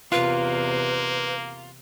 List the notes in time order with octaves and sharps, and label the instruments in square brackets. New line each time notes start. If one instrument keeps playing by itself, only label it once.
[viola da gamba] E2 C3 [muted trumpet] A#3 [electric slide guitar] F4 [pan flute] B4